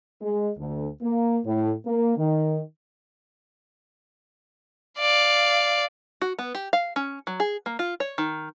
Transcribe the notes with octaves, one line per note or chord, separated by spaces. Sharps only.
G#3
D2
A#3
A2
A#3
D#3
D5 F5
F#4
B3
G4
F5
C#4
F#3
G#4
A#3
F4
C#5
D#3